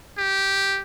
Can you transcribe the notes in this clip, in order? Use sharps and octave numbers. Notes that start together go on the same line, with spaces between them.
G4